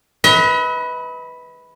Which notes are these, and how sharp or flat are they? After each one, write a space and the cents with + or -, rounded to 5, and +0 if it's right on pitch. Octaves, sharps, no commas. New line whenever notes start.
B4 +0 D#5 +45 A#5 +25